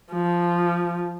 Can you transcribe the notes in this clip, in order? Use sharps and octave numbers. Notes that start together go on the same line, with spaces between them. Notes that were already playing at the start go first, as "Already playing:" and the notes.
F3